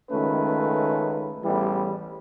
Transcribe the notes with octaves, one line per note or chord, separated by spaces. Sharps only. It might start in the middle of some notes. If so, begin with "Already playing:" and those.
C#2 D#3 A3 C#4 B4
A1 E2 E3 G3